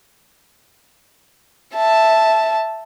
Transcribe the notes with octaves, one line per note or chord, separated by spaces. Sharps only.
E5 A5